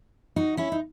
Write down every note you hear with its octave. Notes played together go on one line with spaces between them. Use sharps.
D#4 F#4
C#4 E4
D#4